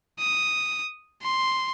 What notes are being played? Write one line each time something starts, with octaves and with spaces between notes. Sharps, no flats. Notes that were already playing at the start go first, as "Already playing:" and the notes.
D#6
C6